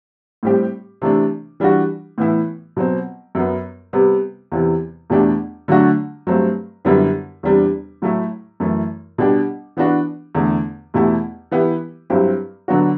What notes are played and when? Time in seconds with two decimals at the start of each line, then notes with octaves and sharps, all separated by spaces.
0.43 A2 G3 C4 G4
1.02 C3 E3 A3 D4
1.60 E3 G3 D4 F#4
2.18 A2 E3 B3 E4
2.77 B2 F#3 C4
3.35 F#2 F#3 B3
3.93 C3 G3 B3
4.52 E2 C3 E3
5.10 E2 B2 A3 D4 G4
5.68 D3 F#3 A3 D4 F#4
6.27 G2 F#3 A3 C4
6.85 F#2 D3 G3 B3 E4
7.43 E2 C3 G3 D4
8.02 A2 F#3 A3 E4
8.60 F#2 E3 A3 E4
9.18 B2 G3 D4 G4
9.77 E3 B3 D4 F#4
10.35 E2 D3 A3
10.94 E2 B2 A3 E4 G4
11.51 E3 B3 E4 G4
12.10 G2 F#3 C4 E4 G4
12.68 D3 F#3 B3 D4 F#4